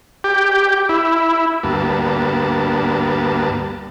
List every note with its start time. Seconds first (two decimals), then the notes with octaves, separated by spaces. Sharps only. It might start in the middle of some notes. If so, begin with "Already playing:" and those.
0.24 G4
0.89 E4
1.63 D2 G2 A#3 B3 A5